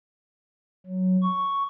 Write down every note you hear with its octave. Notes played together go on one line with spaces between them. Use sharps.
F#3
C#6